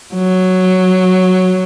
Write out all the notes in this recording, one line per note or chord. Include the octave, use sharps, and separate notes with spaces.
F#3